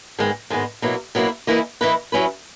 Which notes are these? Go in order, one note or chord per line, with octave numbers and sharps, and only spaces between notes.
G#2 D#3 G#3 B3
G#2 D#3 G#3 B3
B2 F#3 A#3 E4
B2 F#3 A#3 E4
E3 A#3 E4 B4 D#5
E3 A#3 E4 B4 D#5
F#3 C#4 E4 B4